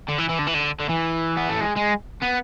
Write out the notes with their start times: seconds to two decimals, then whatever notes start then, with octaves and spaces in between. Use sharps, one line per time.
0.08 D3
0.18 E3
0.29 E3
0.38 D3
0.47 E3
0.54 D3
0.80 D3
0.89 E3
1.37 B3
1.49 A3
1.61 G#3
1.76 G#3
2.22 B3